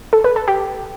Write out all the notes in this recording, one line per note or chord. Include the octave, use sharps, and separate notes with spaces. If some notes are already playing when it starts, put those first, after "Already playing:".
A4
B4
A4
G4